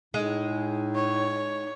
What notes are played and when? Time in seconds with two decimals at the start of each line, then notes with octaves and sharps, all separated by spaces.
0.14 A2 G#3 D#4
0.95 C#5